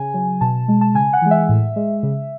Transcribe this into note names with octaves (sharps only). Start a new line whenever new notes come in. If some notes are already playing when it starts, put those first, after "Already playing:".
Already playing: C#3 G#5
F#3
B2 A5
G#3
A5
C#3 G#5
F#5
E3 G#3
E5
A2
G#3
C#3